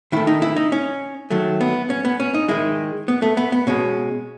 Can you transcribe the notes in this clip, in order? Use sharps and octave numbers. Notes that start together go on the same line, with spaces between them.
D#3 A3 E4
D#4
E4
D#4
C#4
D#3 F#3 A3
B3
C#4
B3
C#4
D#4
D#3 G#3 E4
B3
A3
B3
B3
B2 G#3 C#4